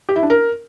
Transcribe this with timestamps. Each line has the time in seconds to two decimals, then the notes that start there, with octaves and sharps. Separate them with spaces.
0.09 G4
0.16 E4
0.23 D4
0.30 A#4